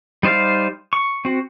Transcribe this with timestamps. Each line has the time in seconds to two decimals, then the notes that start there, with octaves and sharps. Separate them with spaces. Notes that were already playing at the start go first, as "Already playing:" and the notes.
0.23 G3 D#4 C5 D5 F5
0.93 C#6
1.25 C4 F#4